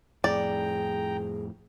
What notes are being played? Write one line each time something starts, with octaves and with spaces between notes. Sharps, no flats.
F2 A2 G#4 D5 G5 A#5